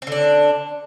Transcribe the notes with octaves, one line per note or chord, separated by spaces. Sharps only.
D3 C4 D4